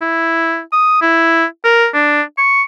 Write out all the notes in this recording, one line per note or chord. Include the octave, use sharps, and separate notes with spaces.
E4
D#6
E4
A#4
D4
C#6